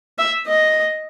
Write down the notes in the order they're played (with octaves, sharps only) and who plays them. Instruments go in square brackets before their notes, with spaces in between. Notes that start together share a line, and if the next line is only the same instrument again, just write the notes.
[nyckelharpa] E5
D#5